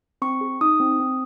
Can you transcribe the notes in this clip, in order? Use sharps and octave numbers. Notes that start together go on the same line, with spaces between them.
C4 C#6
G#4
D#4 D#6
C4
C4